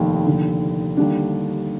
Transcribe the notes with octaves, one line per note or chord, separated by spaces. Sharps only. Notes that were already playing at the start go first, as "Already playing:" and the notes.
Already playing: F1 D#2 D#3
F1 D#2 D3
D#2 D3 G3 D4